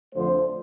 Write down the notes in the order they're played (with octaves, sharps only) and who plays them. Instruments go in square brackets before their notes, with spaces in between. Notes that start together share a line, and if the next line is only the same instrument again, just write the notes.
[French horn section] F2 D3 F3 A3 C5